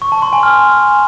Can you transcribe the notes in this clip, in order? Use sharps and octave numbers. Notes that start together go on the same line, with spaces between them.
C#6
A5
C6
G#5
F6